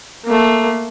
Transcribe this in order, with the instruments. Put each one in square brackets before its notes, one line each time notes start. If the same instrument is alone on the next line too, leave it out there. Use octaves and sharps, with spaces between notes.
[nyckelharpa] A3 A#3